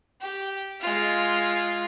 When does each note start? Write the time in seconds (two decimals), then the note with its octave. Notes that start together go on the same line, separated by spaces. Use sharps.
0.21 G4
0.81 G#3 F4